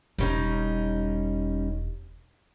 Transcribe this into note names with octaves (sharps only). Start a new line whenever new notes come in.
E1 G3 C#4 D#4